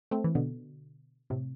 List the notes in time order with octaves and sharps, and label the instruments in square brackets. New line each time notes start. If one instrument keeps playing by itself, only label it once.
[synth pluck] A3 C4
E3
B2 D3
A2 C3